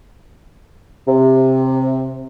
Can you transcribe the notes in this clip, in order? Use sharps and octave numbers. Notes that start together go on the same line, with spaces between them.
C3